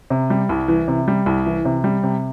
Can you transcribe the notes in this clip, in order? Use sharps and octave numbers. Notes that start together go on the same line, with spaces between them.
C3
G3
C2
E3
C3
G3
C2
E3
C3
G3
C3